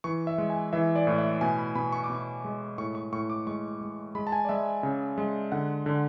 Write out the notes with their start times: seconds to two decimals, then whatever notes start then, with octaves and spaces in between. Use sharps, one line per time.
0.04 E3 C#6
0.27 E5
0.38 G#3
0.50 G#5
0.73 E3 E5
0.96 D5
1.07 A2
1.18 E5
1.41 B2 G#5
1.58 B5
1.75 B2 B5
1.92 C#6
2.04 D6
2.10 B2
2.15 C#6
2.44 G#3
2.78 A2 C#6
2.95 C#6
3.12 A2 C#6
3.30 D6
3.47 G#3 C#6
3.81 G#3
4.15 G#3 B5
4.27 A5
4.32 G#5
4.45 D5
4.49 G#3 E5
4.83 C#3
5.18 G#3
5.52 D3 F#5
5.86 D3